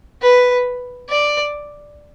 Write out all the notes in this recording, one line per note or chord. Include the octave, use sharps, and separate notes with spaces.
B4
D5